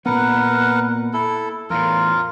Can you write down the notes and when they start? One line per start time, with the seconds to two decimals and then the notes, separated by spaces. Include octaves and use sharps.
0.06 A#2 B3 A#4 B4 F#5
1.13 E4 A4
1.70 E2 A2 F4 A#4